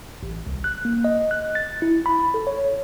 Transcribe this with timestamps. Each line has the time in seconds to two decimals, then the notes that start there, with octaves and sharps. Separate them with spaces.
0.23 A1
0.47 C2
0.64 F#6
0.85 A#3
1.04 D#5
1.31 F#6
1.55 A6
1.82 E4
2.06 B5
2.34 A4
2.47 C#5